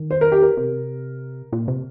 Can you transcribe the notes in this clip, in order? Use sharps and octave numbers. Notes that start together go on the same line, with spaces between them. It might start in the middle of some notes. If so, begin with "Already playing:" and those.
Already playing: D#3
C5
A#4
G4
A#4
C3
A#2
C3